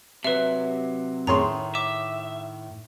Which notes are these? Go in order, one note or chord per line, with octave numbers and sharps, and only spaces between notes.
C3 F#3 B4 E5
A2 D#3 A3 G#4 C#5 A#5 C6
E5 D6